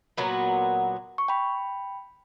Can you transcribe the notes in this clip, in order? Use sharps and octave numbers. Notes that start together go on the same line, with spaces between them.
A#2 F#3 B3 F#4
C#6
G5 B5